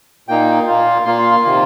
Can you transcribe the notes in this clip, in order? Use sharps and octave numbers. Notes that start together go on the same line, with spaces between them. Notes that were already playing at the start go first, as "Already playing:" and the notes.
A#2 A#3 D#4 G5
A#2 A#3 F4
A#2 A#3 F4 C6
C6
C3 D#3 A#3 F4